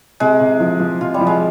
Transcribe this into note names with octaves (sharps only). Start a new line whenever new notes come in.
C3 G#3
C3
F3
F3
C3 F4
G3
F3
G#3